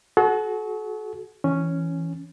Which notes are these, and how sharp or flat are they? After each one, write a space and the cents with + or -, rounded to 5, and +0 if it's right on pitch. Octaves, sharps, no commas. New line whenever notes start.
F#4 +0 A4 -45
E3 +0 C#4 +0